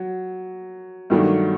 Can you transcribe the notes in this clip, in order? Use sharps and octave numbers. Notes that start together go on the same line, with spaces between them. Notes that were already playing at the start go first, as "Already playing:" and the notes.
Already playing: F#3
G2 D#3 F#3 A3 D4